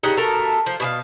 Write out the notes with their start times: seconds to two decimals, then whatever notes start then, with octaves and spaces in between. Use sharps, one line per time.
0.03 C#3 D#4 G4 F#5
0.17 B2 A3 A4 A#4
0.66 F3
0.80 B2 G#4 F5